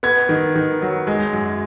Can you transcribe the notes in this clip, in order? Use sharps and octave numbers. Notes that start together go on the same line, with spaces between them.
B3 G#6
D#3
D#3
F#3
G#3
F#2